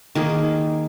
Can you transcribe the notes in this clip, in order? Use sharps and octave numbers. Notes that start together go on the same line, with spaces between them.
D#3 A#3 G#4